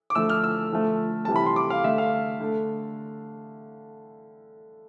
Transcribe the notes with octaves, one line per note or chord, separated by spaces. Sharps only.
D6
D3 F3 A3 E6
F6
E6
D3 F3 A3
C3 E3 G3 A5
B5
C6
D6
F5
D3 A3 E5
F5
D3 A3